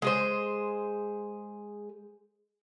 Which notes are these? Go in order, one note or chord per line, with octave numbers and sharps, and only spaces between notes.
G#3 G#4 C5